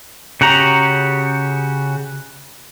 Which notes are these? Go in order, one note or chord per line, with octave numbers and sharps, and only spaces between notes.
C#3 F#4 G4 A#5